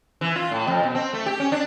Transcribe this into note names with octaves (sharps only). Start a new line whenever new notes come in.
E3
F4
A2
F2
B2
C4
A3
G4
C#4
D4